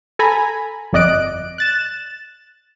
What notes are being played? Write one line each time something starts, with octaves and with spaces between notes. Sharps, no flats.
A4 G#5 A#5 B5
G1 F2 D5 D#5 F#6 D7
F#6 A6 E7